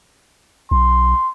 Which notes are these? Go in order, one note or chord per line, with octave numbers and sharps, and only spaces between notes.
B1 C6